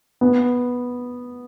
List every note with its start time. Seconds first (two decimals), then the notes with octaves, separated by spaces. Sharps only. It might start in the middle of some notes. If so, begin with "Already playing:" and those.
0.21 B3